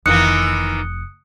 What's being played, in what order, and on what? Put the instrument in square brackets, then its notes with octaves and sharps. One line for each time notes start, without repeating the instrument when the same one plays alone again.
[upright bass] F1 [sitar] D#3 E3 A#3 [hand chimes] D#6 F#6 C#7